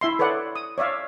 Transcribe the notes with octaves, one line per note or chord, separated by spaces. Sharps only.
E4 E5 C6
A4 B4 C#5 D5 F#5
D#6
C#5 D5 E5 F5